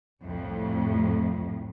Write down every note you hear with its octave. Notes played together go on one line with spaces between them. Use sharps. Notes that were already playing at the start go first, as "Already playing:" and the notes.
C2 F2 A2